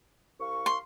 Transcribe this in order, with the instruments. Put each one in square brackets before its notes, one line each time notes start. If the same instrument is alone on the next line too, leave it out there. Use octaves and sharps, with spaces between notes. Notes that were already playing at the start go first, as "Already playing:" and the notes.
[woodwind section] C2 F5 C#6
[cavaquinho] C6